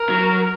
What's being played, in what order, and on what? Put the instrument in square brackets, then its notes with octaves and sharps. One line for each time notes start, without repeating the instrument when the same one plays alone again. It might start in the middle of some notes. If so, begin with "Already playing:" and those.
Already playing: [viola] A#4
[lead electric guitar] F#3